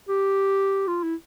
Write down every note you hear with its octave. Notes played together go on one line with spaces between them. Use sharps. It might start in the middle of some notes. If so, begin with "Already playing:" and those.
G4
F4
E4